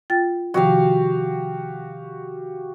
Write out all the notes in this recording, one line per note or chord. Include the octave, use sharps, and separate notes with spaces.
F4 G5 A6
C3 D#3 F3 F#4 G4 F5